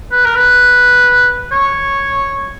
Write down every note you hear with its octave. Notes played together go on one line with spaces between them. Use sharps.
B4
A#4
B4
C#5